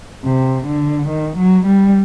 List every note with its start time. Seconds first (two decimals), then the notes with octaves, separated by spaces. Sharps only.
0.25 C3
0.67 D3
1.09 D#3
1.37 F#3
1.66 G3